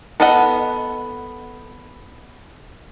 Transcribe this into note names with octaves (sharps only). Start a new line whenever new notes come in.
B3 A4 B4 D#5 F#5